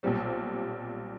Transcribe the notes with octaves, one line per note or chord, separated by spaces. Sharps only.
B1 A#2 G3 C4